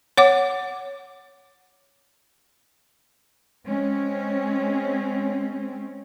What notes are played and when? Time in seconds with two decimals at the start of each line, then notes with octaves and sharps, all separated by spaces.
0.17 C#5 F#5 D6
3.65 G#3 C4 C#4